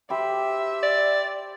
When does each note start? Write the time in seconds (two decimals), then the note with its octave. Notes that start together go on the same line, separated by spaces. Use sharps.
0.10 G4 C5 E5 B5
0.83 D5